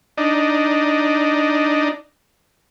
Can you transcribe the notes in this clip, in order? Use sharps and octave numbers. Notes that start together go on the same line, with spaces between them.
D4 D#4